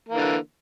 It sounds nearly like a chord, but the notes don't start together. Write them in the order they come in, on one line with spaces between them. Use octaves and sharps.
A#3 E3 D3